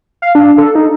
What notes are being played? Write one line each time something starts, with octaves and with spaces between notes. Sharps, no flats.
F5
D4
A4
D#4